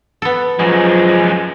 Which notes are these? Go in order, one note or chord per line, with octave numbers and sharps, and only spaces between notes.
B3 A4
F#2 F3 F#3 G#3